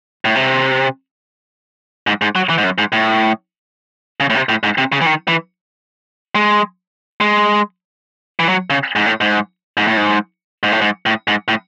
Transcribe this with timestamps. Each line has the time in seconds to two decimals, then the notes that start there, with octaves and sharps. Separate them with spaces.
0.25 A2
0.35 C3
2.07 G#2
2.22 G#2
2.35 F#3
2.50 E3
2.58 G#2
2.64 F#2
2.78 G#2
2.92 A2
4.20 C#3
4.30 A2
4.35 C3
4.49 A2
4.63 G#2
4.78 C3
4.92 C#3
5.01 E3
5.06 D#3
5.28 E3
6.35 G#3
7.21 G#3
8.40 E3
8.49 F#3
8.70 C#3
8.96 G#2
9.06 A2
9.21 G#2
9.77 G#2
9.87 A2
9.97 G#2
10.63 G#2
10.72 A2
10.81 G#2
11.06 A2
11.28 G#2
11.48 A2